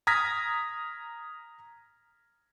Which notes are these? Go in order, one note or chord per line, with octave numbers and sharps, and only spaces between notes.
A#5 D#6 F6 G#6 A#6 B6